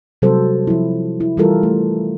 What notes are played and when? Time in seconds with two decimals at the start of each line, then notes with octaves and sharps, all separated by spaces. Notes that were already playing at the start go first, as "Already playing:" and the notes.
0.22 C3 F#3 G3 F#4 A4 C5
0.67 F3 E4
1.20 E4
1.37 E3 G3 E4 F4 A4 A#4
1.63 A3